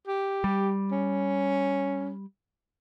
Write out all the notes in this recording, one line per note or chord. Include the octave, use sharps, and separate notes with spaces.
G4
G3
C#4